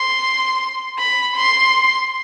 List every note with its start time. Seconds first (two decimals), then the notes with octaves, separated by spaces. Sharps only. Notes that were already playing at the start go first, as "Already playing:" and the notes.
Already playing: C6
0.99 B5
1.36 C6